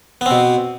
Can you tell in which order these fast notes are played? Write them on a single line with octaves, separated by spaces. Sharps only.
B3 C4 B2